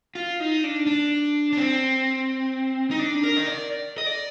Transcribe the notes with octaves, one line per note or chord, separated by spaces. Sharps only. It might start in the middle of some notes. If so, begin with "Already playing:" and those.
F4
D#4
D4
D4
D4
C4
D#4
D4
A#4
D#5
D5
D#5
D5